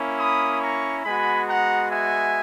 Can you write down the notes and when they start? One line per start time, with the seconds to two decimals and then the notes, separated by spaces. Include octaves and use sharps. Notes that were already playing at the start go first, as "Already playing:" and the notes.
Already playing: A#3 C#4 E4
0.20 B5 D#6
0.62 A#5 C#6
1.05 G#3 B3 F#4 G#5 B5
1.48 F#5 A#5
1.92 E5 G#5